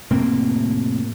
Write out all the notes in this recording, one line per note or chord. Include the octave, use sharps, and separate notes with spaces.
F1 A2 A#3 C4